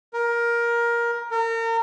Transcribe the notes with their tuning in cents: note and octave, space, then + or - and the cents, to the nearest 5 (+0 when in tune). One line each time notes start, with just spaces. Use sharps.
A#4 +15
A#4 -35